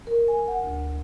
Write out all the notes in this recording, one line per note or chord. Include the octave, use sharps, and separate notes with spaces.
A#4
G#5
F#5
D2